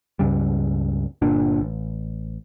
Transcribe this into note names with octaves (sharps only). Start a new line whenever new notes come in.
C#2 G2 C#3 G3
G1 A#2 D4
A1